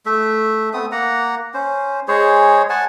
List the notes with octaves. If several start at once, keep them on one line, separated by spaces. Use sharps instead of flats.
A3 E5
A3 B3 C4 D#6
A#3 F#5 A#5
C#4 C5
G#3 G#4 C5 C#5
F#5 G#5 A5